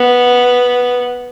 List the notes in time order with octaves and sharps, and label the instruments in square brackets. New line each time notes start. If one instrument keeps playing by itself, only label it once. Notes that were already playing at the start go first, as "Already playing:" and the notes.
Already playing: [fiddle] B3